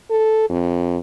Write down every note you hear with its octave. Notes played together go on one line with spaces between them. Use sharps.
A4
F2